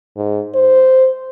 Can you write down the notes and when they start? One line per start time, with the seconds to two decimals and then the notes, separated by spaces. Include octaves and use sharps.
0.17 G#2
0.55 C5